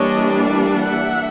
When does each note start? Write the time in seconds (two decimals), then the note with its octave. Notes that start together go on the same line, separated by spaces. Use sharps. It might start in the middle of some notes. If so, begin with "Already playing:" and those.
Already playing: E3 G3 A#3 D4 C#5 D#5
0.73 E5 F#5